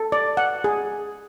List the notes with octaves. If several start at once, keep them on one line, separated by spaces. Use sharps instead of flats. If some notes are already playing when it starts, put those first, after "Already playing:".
Already playing: A4
D5
F#5
G#4